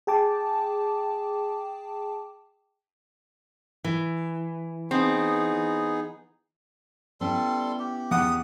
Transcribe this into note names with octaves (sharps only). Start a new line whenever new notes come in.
G#4 G5 A5 D6
E3
B3 C4 D#4 G#4
G3 B3 C#4 E4 A4 C6
G4
E2 F#5 D#6